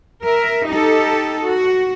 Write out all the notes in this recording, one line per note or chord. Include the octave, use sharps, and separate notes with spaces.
A#4 E5
D#4 G4 A4
F#4